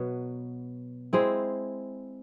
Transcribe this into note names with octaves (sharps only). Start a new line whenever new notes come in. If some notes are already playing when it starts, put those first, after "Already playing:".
Already playing: B2 F#3 B3
G#3 C4 E4 G#4